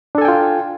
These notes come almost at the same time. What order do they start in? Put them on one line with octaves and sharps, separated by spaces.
D4 A4 G#5 G5 F4